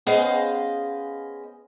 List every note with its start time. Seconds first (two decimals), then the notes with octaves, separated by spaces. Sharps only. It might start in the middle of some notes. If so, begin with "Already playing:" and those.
0.06 B3 C#4 G#4 C5 D#5 F5